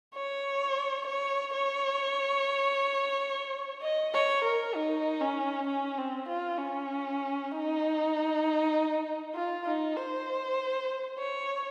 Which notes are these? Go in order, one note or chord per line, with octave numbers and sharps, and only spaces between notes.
C#5
C#5
C#5
D#5
C#5
A#4
D#4
C#4
C#4
C4
F4
C#4
D#4
F4
D#4
C5
C#5